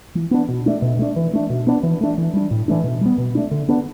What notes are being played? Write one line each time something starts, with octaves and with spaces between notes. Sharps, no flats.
E3
B3 D4
B2
A3 D4
B2
A3 D4
E3
A3 D4
B2
B3 D4
E3
A3 D4
E3
G3 D4
A2
E3 A3 D4
B2
G3 B3
B2
A3 D4
D3
B3 D4